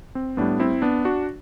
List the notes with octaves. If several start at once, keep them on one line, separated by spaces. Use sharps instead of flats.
C4
A2 G3 B3 D4
C4 E4
B3 D4
D4 F#4